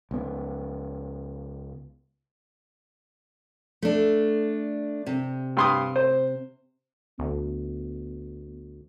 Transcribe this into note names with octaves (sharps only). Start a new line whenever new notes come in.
C#2 B3
A3 D4
C3
G2 C6 D#6
C5
D2 B3